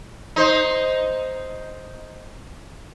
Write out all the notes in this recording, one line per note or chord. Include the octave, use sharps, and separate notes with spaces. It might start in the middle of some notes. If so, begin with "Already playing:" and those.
D#4 C5